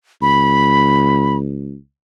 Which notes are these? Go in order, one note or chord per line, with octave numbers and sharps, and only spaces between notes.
C#2 B5